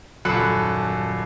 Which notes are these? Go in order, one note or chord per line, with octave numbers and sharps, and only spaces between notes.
D#1 F#2 A4 B5 F#6